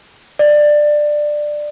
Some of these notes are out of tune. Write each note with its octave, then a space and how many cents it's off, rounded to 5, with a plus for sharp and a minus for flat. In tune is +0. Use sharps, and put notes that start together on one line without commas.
D5 +15